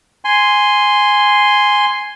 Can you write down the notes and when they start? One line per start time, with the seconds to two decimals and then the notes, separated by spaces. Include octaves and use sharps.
0.25 G#5 C6